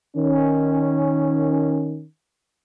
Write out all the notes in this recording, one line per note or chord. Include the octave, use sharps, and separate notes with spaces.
D#3 C#4